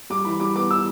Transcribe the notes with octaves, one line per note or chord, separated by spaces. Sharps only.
G3 D6
E3 B5
G3 D6
B3 D6
E3 E6